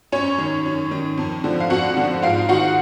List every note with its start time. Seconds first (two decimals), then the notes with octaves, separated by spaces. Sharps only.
0.12 F#2 C#4 C#5
0.38 D#3
0.66 F#2
0.91 D#3
1.18 F2
1.44 D3 F3
1.60 F5
1.70 F2 F#4 F#5
1.97 D3 F3
2.22 G#2 F4 F5
2.49 D#3 F#4 F#5